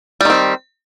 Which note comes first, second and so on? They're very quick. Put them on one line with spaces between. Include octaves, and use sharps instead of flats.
G3 D#3 C4